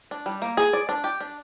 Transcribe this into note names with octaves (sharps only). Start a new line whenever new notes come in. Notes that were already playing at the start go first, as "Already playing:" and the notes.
D4
G3
A#3
G#4
D5
D4
G4
D4